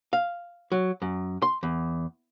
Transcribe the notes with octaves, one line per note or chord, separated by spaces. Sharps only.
F5
F#3
F#2
C6
E2